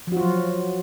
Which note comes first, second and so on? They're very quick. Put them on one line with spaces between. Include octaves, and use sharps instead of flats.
F3 F#4 F4 F#3